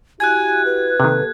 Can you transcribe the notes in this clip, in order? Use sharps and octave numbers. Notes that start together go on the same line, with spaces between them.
E4 F#4 G4 G#5 F#6 G#6
B4
C3 D#3 A#3 G4 A4